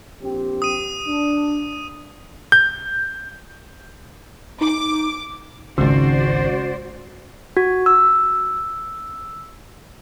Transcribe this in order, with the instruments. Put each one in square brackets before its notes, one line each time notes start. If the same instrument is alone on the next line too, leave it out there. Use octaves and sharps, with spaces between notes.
[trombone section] A#1 C4 G4
[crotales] D#6 D#7
[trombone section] D4
[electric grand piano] G6
[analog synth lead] D#4 [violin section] D6
[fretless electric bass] G#1 C#2 [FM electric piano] C#3 [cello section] F#4 C5 D5
[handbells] F#4
E6